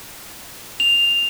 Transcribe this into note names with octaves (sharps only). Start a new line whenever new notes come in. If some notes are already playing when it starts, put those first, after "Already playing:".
F7